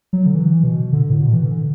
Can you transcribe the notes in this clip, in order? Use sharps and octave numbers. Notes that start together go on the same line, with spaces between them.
F#3
D3
E3
B2
D3
A2
B2
E3
D3